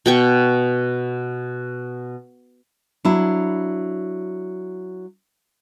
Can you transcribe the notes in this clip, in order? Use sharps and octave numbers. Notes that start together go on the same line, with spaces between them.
B2 G5 C#6
F#3 D4 E4